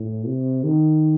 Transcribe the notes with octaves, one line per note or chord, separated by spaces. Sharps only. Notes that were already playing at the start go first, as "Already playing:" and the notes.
Already playing: A2
C3
D#3